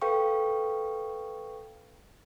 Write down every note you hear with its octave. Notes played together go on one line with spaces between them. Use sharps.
A4 B4 F5 G5 C#6